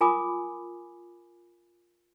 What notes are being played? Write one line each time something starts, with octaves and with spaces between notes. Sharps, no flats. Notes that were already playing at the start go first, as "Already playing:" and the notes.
F4 A#4 G#5 B5 D6 D#6